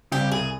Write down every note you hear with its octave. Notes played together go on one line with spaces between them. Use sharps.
C#3 G3 C4 G4
C2 G#4